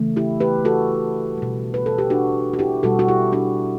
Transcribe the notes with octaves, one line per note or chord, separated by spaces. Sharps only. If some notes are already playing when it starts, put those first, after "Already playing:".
Already playing: C#3 E3 A3
E4 G4
G4 B4
F#4 A4
B2 G3
B4
A4
G4
D4 F#4
F#4
E4 G4
B2 G3 F#4 A4
F#4
E4 G4
D4 F#4